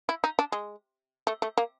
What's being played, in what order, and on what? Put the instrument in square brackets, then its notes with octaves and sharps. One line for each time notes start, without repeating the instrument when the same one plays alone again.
[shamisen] E4
D#4
D4
G#3
A3
A3
A#3